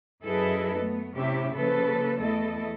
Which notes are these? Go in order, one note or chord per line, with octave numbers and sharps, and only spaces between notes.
F#2 E4 G#4 A4 B4 D#5
A3 B3
A2 C3 C#4 E4 G4 E5
C#3 F3 A#3 A4 B4
E2 A3 E4 A4 D#5